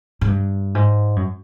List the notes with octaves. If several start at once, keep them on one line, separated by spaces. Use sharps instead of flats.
G#2
G2
G#2
F#2